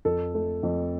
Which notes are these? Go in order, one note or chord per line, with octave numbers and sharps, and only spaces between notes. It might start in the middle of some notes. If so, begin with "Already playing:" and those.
F2 A4
A3
F2